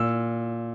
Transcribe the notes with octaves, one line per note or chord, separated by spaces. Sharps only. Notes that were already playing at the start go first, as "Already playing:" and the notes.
Already playing: A#2 E6